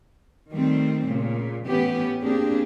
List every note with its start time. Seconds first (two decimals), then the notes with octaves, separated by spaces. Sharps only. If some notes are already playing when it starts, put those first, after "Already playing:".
0.51 D#3 G3 A3 C4
1.08 A#2 C#3
1.67 A2 E3 B3 C#4 G4
2.22 A#3 C4 D4 G4 G#4